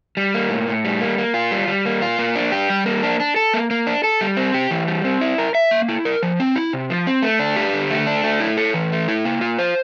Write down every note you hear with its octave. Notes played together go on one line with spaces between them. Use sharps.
G3
A#3
A2
A2
G3
A#3
A#3
F4
G3
G3
A#3
F4
A#3
D4
G4
G3
A#3
D4
D4
A4
A#3
A#3
D4
A4
G3
C4
G4
E3
G3
C4
E4
A#4
E5
A#3
E4
A#4
F3
C4
E4
C3
F3
C4
A3
D4
G4
D3
A3
D4
A3
E4
A4
E3
A3
E4
A#3
F4
C5